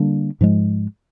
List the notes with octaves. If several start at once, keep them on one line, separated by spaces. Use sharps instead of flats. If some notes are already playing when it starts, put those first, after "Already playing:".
Already playing: D3 G3 A#3 D4
G#2 F3 G#3